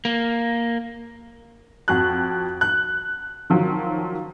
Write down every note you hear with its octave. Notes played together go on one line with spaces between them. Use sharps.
A#3
F2 F#4 F#6
F#6
D#3 F3 F#3